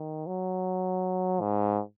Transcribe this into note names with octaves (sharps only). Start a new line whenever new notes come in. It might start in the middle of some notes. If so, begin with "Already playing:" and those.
Already playing: D#3
F#3
G#2